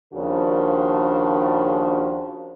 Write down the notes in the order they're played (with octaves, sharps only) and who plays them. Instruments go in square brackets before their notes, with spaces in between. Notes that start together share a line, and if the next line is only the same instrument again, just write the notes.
[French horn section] D#2 C#3 F3 D4 F#4 A#4